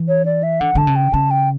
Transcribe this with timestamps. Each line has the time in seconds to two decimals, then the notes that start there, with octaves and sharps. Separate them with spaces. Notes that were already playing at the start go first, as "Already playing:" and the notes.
Already playing: E3
0.08 C#5
0.25 D5
0.43 E5
0.60 D3 F#5
0.75 D3 A5
0.87 C#3
0.96 G5
1.13 C#3 A5
1.31 G5